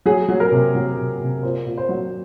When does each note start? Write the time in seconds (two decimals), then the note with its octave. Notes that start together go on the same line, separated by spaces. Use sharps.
0.06 F#3 G#4
0.29 F#3
0.40 A#4
0.52 C3
0.75 F#3
0.97 C3
1.20 C3
1.43 A#2 C5
1.66 A#2
1.78 C5
1.89 F#3